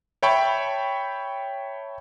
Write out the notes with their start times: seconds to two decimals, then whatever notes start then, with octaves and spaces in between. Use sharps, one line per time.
0.23 C#5 E5 G5 A5 B5 C#6